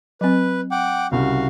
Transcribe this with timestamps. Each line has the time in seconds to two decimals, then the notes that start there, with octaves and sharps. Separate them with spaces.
0.21 F#3 C4 B4
0.71 F#5 G5 D6
1.12 C2 C#3 F#4 F5